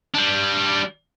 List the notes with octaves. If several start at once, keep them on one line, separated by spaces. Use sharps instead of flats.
G3 D4